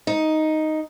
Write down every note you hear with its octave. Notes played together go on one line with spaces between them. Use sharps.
D#4